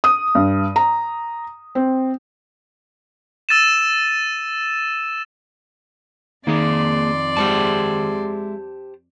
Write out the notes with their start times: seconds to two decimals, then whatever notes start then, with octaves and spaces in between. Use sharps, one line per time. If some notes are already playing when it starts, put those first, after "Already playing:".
0.04 D#6
0.35 G2
0.76 A#5
1.75 C4
3.49 E6 A6 D#7 E7
6.47 F2 D#3 A#3 G#4 D5 C6
7.37 G#3 E4 G4 C5 A5